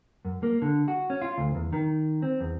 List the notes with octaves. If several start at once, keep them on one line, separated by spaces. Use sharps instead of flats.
F#2
A#3
D3
F#4
C#4
F4
D2
E2
D#3
C4
E2